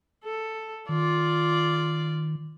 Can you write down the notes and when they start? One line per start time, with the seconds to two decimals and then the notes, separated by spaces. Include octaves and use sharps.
0.24 A4
0.89 D#3 F4 D5